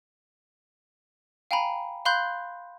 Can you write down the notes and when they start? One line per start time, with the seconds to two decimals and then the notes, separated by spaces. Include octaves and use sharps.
1.51 F5 G5 G#5 A#5 B5
2.05 F5 B5 C6 F#6 G6